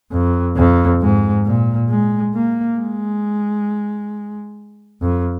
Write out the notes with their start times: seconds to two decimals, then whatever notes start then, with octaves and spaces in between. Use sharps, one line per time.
0.12 F2
0.56 F2
1.01 G#2
1.46 A#2
1.89 G#3
2.34 A#3
2.79 G#3
5.02 F2